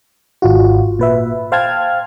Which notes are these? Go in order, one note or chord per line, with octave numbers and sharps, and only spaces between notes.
G#1 F4 F#4
A#2 B4 E5
C5 F5 G5 A5 F6 G#6